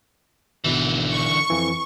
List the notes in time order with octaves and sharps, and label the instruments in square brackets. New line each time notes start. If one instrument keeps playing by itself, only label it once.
[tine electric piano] G#1 B2 [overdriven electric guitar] D3 E3
[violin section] C#6
[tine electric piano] F2 E3